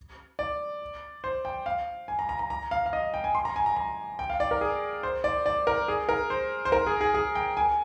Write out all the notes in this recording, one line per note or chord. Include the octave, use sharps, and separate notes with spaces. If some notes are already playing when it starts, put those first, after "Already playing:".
D5
C5
G5
F5
G#5
A#5
A#5
A#5
A#5
F5
F5
D#5
G5
G#5
C6
A#5
G#5
A#5
A#5
G5
F5
D5
A#4
G#4
C5
D5
D5
A#4
G#4
A#4
C5
C5
A#4
G#4
G#4
G#4
G5
G#5